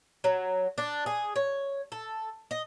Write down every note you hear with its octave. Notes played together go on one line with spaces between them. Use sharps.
F#3
D4
G#4
C#5
A4
D#5